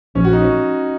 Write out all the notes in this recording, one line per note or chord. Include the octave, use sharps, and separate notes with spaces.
A#1 A#2 F3 C#4
F#4
D#4
C#4